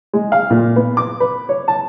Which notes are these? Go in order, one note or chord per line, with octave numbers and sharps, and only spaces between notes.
G#3
F5
A#2
B3
D6
B4
C#5
A5